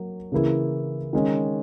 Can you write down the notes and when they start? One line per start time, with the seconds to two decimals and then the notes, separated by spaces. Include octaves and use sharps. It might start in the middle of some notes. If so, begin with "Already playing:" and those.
Already playing: F#3 A#3
0.32 C#3 E3 A#3 E4 G#4
1.13 D#3 G#3 C#4